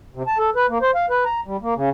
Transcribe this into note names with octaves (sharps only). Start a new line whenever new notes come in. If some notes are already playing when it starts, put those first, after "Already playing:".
C3
A5
A4
B4
A#3
C5
F5
B4
A#5
G3
A#3
C#3